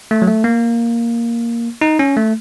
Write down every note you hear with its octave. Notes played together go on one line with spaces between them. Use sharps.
A3
F#3
A3
A#3
D#4
C#4
A3